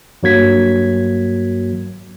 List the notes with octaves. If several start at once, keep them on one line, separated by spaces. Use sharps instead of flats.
G2 F#3 A#3 G#6 B6